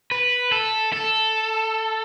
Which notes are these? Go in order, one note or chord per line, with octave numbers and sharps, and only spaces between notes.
B4
A4
A4